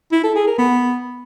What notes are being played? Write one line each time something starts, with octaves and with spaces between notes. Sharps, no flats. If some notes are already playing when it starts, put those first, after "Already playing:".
E4
A4
G#4
A#4
B3